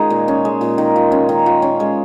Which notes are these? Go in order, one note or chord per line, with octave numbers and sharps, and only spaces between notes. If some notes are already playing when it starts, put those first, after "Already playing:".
Already playing: D#3 G#3 C#4 D#4 F4 G#4
A#2
C#4
G#3
A#2
D#3
F4
C#4
D#3
F4
C#4
G#3